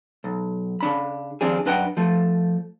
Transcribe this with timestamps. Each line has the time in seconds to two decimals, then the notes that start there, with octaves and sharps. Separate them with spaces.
0.24 B1
0.81 C#3 D4 B5
1.41 D#2 F3 C4 D4 G#4
1.66 F#2 D4 B4 D#5 F#5 G5
1.97 F3 A3